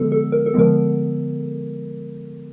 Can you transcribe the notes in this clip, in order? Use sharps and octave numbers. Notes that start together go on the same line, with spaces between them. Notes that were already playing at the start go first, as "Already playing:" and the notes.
Already playing: D3 F3 G#3 B3 A4
A4
A#4
A4
D3 F3 G#3 B3 A#4